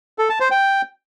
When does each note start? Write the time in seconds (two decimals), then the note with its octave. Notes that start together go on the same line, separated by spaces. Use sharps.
0.19 A4
0.29 A5
0.40 C5
0.51 G5